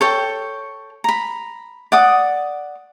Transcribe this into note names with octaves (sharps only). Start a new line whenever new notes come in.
A4 C#5 G5
A#5 B5
D5 F#5 D#6